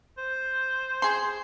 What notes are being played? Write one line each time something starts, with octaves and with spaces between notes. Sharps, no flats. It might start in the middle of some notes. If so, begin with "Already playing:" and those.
C5
G#4 C6